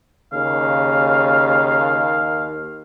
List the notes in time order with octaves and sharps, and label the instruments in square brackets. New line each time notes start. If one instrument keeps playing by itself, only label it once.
[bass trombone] D#2 [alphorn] C#3 [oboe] F5